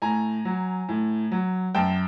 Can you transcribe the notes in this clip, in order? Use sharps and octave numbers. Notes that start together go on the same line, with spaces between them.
A2 G#5 A#5
F#3
A2
F#3
F#2 G5 A5